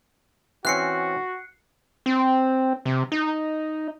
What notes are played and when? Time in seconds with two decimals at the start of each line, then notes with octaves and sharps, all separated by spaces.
0.65 E3 C4 C#4 F#4 F#6 C7 C#7
2.06 C4
2.85 C3
3.12 D#4